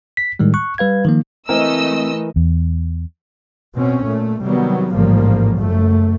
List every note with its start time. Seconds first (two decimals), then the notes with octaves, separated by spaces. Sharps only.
0.17 B6
0.39 A2 D#3 G3 G#3
0.54 C#6 F#6
0.78 G3 B4 F5 G#6
1.05 D#3 F3 A#3
1.49 E3 A3 C4 A#4 D#5 E6
2.36 E2
3.76 B2 C4 C#4
4.06 A#2 A3
4.43 C3 D#3 F#3 G3 B3
4.94 A1 G#2 C#3 F3 G3 A#3
5.59 F#1 F#2 A3